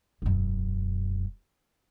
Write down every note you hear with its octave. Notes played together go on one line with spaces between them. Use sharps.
E1 F#2